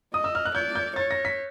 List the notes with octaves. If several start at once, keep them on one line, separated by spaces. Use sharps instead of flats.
D#5 D#6
E6
F6
F#6
D5 G6
G6
C#5 A6
A#6
B6